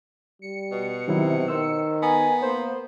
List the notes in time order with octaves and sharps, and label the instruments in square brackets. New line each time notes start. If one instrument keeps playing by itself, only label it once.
[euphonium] G3 [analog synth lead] C#7
[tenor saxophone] B2
[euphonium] C3 [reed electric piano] D#3 F#3 E4
[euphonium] D#3 [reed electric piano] C5 E6
[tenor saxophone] B3 [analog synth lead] G#5 [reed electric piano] A#5
[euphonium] A#3 [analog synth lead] C5